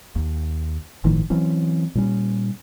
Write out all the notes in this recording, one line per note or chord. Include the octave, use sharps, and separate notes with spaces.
D#2
G1 A2 D#3 F3
E3 F#3 C4 C#4
A#2 G3 C#4